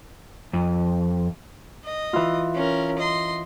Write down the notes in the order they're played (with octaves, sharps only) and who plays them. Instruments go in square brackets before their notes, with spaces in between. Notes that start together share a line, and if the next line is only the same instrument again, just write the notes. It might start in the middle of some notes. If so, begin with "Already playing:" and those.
[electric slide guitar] F2
[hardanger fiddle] D#5
[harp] E3 F4
[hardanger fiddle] C#4 A#4
D#5 C6